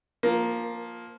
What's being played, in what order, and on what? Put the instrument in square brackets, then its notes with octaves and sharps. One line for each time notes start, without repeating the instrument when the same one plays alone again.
[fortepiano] F3 A#3